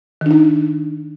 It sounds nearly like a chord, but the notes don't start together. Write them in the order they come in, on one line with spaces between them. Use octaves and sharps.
D#3 D4 D#4